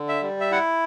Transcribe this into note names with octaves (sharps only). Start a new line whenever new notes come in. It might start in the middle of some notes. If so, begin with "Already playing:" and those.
Already playing: D3
E5
G3
E5
E4 F#5